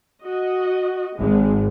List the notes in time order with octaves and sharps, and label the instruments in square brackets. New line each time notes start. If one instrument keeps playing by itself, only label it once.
[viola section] F#4 D#5
[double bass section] G#1 [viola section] G#3